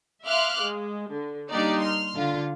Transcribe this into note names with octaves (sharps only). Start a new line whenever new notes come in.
E5 F5 C6 D6 F6 F#6
G#3
D3
G3 A#3 D4 D#4 G4 D5
C6 F6
D3 F4